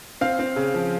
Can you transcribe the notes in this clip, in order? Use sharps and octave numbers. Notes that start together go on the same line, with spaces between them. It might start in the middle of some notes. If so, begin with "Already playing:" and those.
C4 F5
C4
C#3
F3